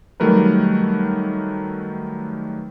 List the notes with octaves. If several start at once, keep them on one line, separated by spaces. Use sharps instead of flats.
D#3 F#3 G3 A3 A#4 B4